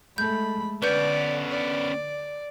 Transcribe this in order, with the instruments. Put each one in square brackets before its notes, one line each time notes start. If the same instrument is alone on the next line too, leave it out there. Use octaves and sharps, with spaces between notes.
[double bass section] G#3 A3 [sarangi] B5 [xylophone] G6
[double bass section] D3 [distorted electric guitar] B3 C#4 [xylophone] B4 G6 [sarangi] D5
[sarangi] D5